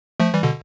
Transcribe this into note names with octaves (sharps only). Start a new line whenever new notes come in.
F3 A3
E3 G3
B2 D3